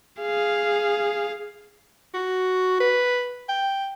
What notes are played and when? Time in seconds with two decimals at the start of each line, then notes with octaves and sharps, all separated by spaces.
0.21 G#4 F5
2.14 F#4
2.80 B4
3.49 G5